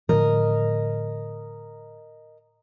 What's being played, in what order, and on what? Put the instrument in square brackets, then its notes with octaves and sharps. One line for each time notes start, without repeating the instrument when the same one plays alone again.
[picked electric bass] A2 D3 F3 [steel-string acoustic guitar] A#4 D#5